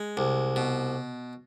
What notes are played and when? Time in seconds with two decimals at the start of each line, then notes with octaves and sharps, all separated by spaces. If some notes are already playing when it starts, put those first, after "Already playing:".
Already playing: G#3
0.17 C2
0.56 B2